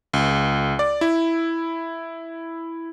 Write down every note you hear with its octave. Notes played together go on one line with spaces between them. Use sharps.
C#2
D5
E4